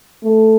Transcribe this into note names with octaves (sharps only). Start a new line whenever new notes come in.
A3